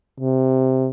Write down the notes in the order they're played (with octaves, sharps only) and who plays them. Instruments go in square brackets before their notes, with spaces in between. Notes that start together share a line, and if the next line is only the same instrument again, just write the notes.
[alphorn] C3